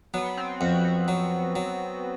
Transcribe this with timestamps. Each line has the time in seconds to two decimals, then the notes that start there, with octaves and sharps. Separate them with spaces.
0.14 F#3 B3
0.37 C4
0.61 F2 F#4
0.85 F#4
1.08 F#3
1.56 F#3